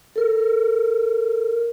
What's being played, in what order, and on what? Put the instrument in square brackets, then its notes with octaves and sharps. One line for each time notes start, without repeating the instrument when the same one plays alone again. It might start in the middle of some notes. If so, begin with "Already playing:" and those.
[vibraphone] A4 A#4